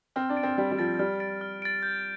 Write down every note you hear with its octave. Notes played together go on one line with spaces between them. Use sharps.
C4 F6
D4
A6 D7
C4
G3 F6
G3
F3 A6 D7
G3 F6
A6 D7
F6
A6 D7
G6